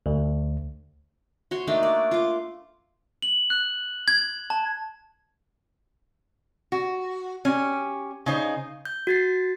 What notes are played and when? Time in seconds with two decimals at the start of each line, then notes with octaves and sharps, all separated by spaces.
0.06 D2
1.51 F#4 C#5 C6
1.67 A3 A#3 D4 D#4
1.83 D5
2.11 F4 D6
3.22 F#7
3.50 F#6
4.08 G#6
4.50 A5
6.72 F#4
7.45 C#4 G4
8.26 C#3 D#4 C5
8.85 G6
9.07 F#4 A6 C7